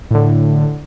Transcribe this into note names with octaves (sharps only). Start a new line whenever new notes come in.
A2 D3